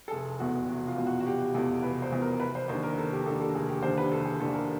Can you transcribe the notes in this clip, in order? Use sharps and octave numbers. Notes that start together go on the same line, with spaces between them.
A4
F1 G#4
E2 B2 F#4
F1 F#4
F4
E2 B2
F#4
F#4
F1 G4
E2 B2 A4
F1 B4
C5
E2 B2
A#4
F1 B4
C5
D#2 D3 C5
A#4
F1 A4
G4
D#2 D3 A4
A4
F1 G#4
G4
D#2 D3 C5
B4
F1 A4
G#4
D#2 D3 A4
A#4